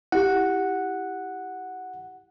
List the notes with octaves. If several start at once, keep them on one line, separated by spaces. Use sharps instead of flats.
E4 G4 F#5